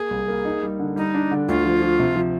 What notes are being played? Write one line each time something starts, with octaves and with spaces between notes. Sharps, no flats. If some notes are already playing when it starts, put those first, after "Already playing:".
Already playing: A#3 G#4
C2
A#3
D#4
G3
D3
G3 D#4
D4
D3
D2 F4
F3
F3
C3
F3